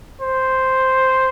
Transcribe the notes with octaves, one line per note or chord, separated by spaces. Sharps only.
C5